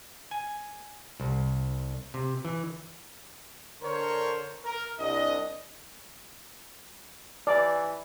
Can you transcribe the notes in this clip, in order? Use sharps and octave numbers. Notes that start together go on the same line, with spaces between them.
G#5
C2
C3
E3
D3 A#4 C5 C#5
A#4
C2 D4 D#5
E3 D5